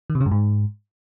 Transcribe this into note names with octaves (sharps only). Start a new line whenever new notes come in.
D#3
C3
C#3
G2
G#2